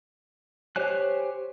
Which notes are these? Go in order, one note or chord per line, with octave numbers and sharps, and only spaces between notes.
G4 C5 C#5 G#5 F#6